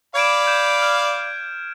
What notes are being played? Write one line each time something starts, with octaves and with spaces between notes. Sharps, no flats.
D5 F5 B5 G#6 D7 E7
G6 E7
F6